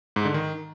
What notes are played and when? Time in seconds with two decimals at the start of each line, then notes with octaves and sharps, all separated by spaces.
0.16 G#2
0.25 D3
0.34 D#3